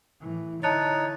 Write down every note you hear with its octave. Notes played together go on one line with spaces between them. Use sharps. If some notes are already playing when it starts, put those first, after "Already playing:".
A2 E3
D3 D#4 E4 C#5 A5 F#6 A6